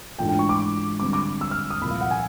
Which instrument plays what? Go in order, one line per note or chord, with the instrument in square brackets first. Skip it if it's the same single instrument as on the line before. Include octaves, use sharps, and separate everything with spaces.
[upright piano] G#2 E3 A3 D4 F4 [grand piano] G5
[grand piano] G5
C#6
D6
[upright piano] D3 G3 C4 [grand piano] D6
[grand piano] D6
E6
F6
D#6
[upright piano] C2 A#2 F3 A#3 [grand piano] B5
[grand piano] F5
F#5
G#5